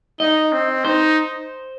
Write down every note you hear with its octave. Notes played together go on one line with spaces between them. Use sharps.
D#4 D#5
C4
D#4 C5